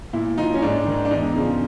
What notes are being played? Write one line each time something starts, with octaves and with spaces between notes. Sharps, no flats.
A#2 E4
F3 D#4
C#4
G#2 D4
D#3
D4
E2 D#4
C#3 F3